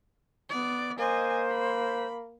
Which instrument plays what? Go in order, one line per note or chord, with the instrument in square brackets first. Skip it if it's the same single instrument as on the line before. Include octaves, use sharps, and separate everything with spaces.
[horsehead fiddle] B3 D5
[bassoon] A#3 [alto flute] C5 [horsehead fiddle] D#5 G#5
[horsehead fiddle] B5